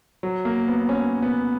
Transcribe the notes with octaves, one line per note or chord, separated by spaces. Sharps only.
F#3
A#3
B3
C#4
B3